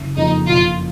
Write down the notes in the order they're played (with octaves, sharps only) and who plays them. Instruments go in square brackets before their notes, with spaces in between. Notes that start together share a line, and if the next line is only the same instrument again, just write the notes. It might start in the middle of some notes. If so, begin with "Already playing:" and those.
Already playing: [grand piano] F#1
[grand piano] F2 C#3 F3 A#3 [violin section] D#4
[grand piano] F#1 [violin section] F4